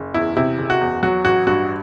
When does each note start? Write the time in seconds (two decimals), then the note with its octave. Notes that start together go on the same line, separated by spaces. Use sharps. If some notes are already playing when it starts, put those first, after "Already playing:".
Already playing: F#1
0.14 E2 E4
0.36 C3 E4
0.58 F#1
0.70 F#4
0.81 E2
1.03 F#3 F#4
1.25 A1 F#4
1.47 G2 F#4